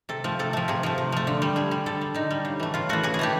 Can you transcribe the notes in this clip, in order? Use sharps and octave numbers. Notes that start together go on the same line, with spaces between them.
C3 A4
F3 A3
C3 A4
F3 A3
C3 G#4
F3 A3
C3
F3 A3
D3
G3
D3 G#4
G3
D3 A4
G3
D3 D#4
G3
C#3
E3 A3
C#3 F4
E3 A3 F#4
C#3 G#4
G#4
E3 A3 G4